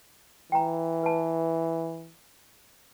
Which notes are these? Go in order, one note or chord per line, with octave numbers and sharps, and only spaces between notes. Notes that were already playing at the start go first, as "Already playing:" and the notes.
E3 G5 A#5
B4 A5